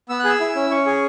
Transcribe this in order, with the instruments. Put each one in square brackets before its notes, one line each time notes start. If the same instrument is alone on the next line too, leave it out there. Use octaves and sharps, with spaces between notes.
[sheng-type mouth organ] B3 E6
F#6
G#4 E6
E4
C#4
C#4 C#6
G#4